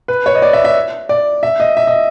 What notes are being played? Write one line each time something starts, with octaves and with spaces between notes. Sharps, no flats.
B4
C#5
D#5
D5
E5
E5
D5
E5
D#5
E5
D#5